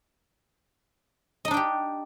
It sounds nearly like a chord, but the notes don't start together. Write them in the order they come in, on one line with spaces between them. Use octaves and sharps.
D#5 D#4 D4 G5 G4